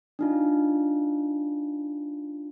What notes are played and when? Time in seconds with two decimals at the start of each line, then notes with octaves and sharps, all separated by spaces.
0.19 D4 D#4 F4